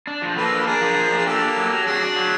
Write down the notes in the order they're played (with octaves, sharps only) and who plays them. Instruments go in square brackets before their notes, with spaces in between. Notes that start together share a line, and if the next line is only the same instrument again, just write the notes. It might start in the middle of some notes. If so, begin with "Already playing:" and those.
[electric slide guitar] D4
F3
[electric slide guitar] A#3 [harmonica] A4 B4
[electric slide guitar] D4
[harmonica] B4
[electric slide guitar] D4 [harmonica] G#4 A#4
[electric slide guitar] F3
F3
D4
[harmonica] G#4
[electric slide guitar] A#3 [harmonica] G4 A4
[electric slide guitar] A#3
F#3
F#3
[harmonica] A4
[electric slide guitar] D4 [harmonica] F#4 G#4
[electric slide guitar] D4
F#3